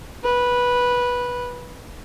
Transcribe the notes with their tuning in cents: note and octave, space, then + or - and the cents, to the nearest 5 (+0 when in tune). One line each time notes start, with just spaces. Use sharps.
B4 -10